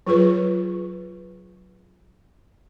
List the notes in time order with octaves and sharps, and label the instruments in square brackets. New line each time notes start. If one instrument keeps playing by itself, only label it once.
[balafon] F#3 F4 G#4 B4